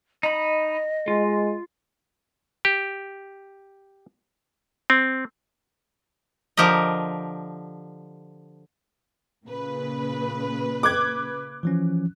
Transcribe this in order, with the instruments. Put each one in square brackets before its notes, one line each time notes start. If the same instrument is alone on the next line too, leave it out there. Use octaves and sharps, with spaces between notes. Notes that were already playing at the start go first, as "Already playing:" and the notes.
[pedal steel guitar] D#4 B5 [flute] D#5
[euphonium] G#3 [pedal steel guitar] F4
[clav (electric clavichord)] G4
C4
[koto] D3 F3 G4 A#4 D#5
[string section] A#2 C#3 B4
[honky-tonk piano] D6 F#6 G#6
[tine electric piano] E3 F3 C#4